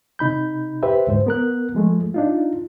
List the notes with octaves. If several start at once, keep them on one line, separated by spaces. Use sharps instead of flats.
C3 D#4 B5 G6
G4 B4 C5 E5
D2 G#2 C5
B3 A#4 F#6
F3 G#3 A3
D4 D#4 F4